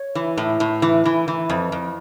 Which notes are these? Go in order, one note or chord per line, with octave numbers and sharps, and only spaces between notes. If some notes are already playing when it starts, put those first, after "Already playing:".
Already playing: C#5
E3
A2
A2
E3
E3
E3
F2
F2